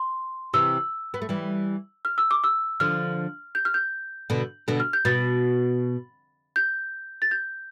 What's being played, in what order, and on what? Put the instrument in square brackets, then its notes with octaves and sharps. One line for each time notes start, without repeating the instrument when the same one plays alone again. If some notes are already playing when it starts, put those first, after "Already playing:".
Already playing: [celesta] C6
[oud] C3 E3 [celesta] E6
[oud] B3
A3
E3 G3
[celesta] F6
E6
D6
E6
[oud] D3 F3 [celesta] F6
[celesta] G6
F6
G6
[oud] B2 D3
B2 D3
[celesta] F6
G6
[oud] B2 [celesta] A6
[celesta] G6
A6
G6